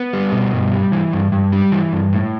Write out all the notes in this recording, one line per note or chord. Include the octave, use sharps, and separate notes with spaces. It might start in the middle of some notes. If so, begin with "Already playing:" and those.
Already playing: B3
G3
B2
G2
G3
E3
G2
G2
G3
E3
G2
A2